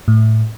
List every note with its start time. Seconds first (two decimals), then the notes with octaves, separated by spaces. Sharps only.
0.08 A2